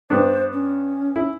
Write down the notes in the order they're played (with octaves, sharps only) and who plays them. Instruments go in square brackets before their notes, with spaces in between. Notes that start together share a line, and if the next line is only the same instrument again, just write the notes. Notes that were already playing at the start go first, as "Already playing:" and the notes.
[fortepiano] G2 B3 D4 [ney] C5
[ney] C#4
[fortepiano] E4